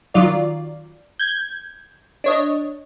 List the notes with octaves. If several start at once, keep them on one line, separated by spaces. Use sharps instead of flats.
D#3 F#3 F4 D5
G6 G#6
D4 C#5 D#5